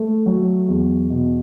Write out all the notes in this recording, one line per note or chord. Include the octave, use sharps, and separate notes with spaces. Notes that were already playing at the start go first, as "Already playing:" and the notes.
Already playing: A3
F#3
E2
B2